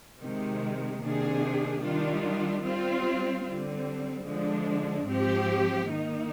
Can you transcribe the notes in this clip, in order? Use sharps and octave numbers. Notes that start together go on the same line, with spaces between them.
C3 D#3 G#3
C3 D#3 A#3 D4 G#4
D#3 G3 D4 F4
G3 C4 F4
D3 G3 C4
D3 F3 G#3 D4
G#2 F3 C4 G4
D#3 A#3 D#4